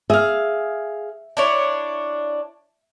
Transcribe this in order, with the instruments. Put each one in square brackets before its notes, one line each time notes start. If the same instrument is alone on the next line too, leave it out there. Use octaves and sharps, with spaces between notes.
[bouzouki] G#4 F5 [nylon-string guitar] E5
[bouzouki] D4 E4 C#5